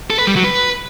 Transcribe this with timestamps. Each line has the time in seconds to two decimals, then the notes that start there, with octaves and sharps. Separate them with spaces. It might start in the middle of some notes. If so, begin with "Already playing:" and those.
0.10 A4
0.19 B4
0.27 G3
0.36 F#3
0.44 B4